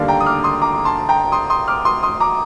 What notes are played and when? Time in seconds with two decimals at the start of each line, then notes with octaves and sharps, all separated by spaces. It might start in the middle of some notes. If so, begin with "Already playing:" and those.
Already playing: D#2 D3 G3 A#3 D5 F5
0.08 G5 A#5
0.20 D#6
0.26 D6 F6
0.44 C6 D#6
0.61 A#5 D6
0.85 A5 C6
1.09 G5 A#5
1.32 C6 D#6
1.50 C6 D#6
1.68 D6 F6
1.85 C6 D#6
2.03 C6 D#6
2.20 A#5 D6